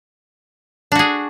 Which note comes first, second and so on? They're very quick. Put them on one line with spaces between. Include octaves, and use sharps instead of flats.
D4 F#4 G#4